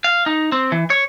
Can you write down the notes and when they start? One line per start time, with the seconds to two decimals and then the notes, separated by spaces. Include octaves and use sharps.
0.04 F5
0.26 D#4
0.52 C4
0.72 E3
0.90 C#5